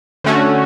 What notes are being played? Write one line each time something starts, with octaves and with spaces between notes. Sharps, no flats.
D3 A3 C#4 F#4